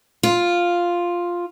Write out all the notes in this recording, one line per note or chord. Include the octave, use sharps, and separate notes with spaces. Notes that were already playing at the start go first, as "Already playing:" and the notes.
F4